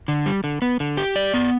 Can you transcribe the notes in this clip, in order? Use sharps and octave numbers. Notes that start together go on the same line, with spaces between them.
D3
G3
D3
B3
D3
G4
D5
B3